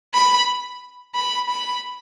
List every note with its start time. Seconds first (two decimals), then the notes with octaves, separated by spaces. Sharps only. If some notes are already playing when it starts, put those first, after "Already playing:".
0.14 B5
1.15 B5
1.50 B5